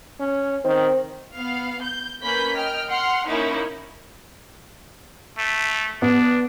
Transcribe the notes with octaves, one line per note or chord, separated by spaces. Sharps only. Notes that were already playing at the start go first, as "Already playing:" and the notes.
C#4
D#3 C4
B3 F5
G6
A#3 C#4 B4 B5 G6 B6
D#5 G5 F6
F#5 C6 F6
A#3 C#4 D#4 E4 A#4 C#5
A3
B3 D4